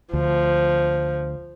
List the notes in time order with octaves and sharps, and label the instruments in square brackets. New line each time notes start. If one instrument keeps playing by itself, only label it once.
[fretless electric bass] D2 [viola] F3